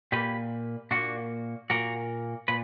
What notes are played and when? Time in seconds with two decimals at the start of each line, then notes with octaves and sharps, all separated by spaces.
0.12 A#2 A#3 G4 B4
0.91 A#2 A#3 D4 F#4
1.70 A#2 A#3 F#4 A#4
2.48 A#2 B4